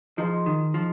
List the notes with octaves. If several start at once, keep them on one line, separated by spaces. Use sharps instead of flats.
F3 D#4 G#4 C5
D#3
F3